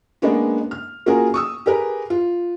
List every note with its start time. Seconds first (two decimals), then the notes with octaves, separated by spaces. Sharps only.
0.22 G#3 A#3 B3 C#4 D4
0.71 F6
1.06 A#3 C#4 F4 F#4 G#4 A#4
1.34 C#6 D#6 E6
1.66 G4 G#4 A#4 B4
2.10 F4